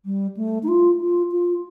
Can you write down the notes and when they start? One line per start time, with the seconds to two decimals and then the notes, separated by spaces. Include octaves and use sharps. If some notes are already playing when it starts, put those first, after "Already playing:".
0.05 G3
0.37 A3
0.63 D#4
0.68 F4
1.01 F4
1.32 F4